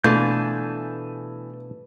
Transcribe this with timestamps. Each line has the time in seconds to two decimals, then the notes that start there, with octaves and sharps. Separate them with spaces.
0.04 B2 E3 A3 D4 F4 G#5 A5 G6